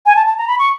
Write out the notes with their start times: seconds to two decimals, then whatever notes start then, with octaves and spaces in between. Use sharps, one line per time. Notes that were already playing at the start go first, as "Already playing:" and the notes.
0.06 G#5
0.16 A5
0.26 A5
0.38 A#5
0.48 B5
0.59 C#6